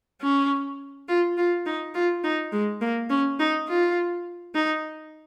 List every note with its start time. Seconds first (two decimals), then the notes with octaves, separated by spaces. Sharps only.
0.22 C#4
1.08 F4
1.38 F4
1.67 D#4
1.95 F4
2.24 D#4
2.53 G#3
2.81 A#3
3.11 C#4
3.40 D#4
3.68 F4
4.55 D#4